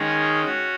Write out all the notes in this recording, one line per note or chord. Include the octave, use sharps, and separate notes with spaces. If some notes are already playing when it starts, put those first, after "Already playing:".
Already playing: D#3 G#3 C#4 G#4
C#4 F#4